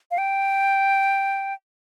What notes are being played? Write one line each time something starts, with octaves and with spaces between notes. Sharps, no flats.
F5
G5